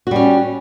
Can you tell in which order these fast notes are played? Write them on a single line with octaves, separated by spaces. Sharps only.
F#4 G3 C#4